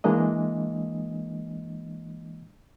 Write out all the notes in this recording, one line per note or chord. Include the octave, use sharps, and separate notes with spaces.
E3 G#3 A#3 D4 D#5